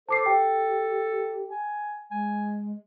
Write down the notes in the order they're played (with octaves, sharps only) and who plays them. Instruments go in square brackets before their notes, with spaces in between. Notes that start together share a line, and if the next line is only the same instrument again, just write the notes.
[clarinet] A4 [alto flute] C5 [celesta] A5 D6 C7
[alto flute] G4 [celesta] G5
[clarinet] G#5
[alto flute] G#3 [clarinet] G#5